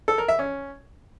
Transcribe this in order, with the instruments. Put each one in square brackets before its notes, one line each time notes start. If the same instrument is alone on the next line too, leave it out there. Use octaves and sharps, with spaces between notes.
[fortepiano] A4
A#4
E5
C#4